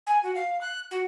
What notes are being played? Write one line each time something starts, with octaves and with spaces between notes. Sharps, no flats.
G#5
F#4
F5
F#6
F#4